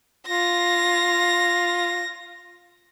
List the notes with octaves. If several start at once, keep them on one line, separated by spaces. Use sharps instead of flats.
F4 A#6